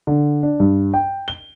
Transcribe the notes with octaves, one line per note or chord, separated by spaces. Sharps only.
D3
D4
G2
G5
G7